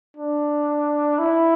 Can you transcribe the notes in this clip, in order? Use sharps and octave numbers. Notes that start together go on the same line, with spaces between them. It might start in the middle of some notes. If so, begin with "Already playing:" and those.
D4
E4